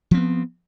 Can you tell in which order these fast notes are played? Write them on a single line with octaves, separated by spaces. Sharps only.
F3 C4 B3